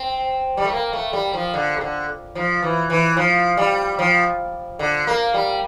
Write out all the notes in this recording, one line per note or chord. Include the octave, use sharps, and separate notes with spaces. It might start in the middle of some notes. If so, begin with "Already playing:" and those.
Already playing: C4
G3
A3
A#3
A3
G3
F3
D3
C3
D3
F3
E3
E3
F3
G3
F3
D3
A#3
G3